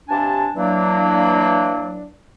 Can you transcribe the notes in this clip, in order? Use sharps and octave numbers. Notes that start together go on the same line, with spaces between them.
G2 C3 D4 G#5 A5
E3 F#3 A#3 D4